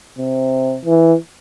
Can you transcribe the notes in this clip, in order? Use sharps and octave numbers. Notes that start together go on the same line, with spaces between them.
C3
E3